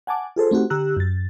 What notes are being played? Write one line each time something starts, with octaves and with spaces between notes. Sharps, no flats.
F#5 G#5 A5 D6
F4 G#4 A4 C5
A3 C4 D#4 F#4 G4
D3 G4 A#5 E6 F#6
F#2 A6